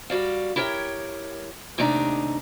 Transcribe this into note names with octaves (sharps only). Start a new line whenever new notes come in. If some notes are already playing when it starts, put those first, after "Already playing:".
G3 F#4 D5 F5
E4 G4 A#4 C#5 G5
D#2 C3 A3 D4 D#4 A#5